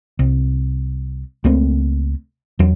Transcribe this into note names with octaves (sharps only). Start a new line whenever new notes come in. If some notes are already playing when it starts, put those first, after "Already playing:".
C2
C#2 A3 A#3 C4
E2 F#3